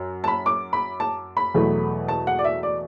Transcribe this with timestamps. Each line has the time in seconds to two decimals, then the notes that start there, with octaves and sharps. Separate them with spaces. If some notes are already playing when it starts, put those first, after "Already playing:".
Already playing: F#2
0.24 A5
0.28 B5
0.46 D6
0.73 B5
1.00 A5
1.37 B5
1.54 E2 B2 F#3 A3
2.08 A5
2.27 F#5
2.39 D5
2.44 E5
2.63 D5